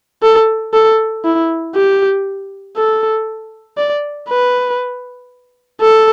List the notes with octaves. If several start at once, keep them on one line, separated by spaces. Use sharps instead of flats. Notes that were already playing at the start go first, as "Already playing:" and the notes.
A4
A4
E4
G4
A4
D5
B4
A4